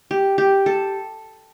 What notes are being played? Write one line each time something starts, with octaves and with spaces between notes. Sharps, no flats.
G4
G4
A4